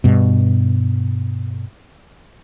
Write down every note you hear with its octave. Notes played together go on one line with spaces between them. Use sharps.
G2 B2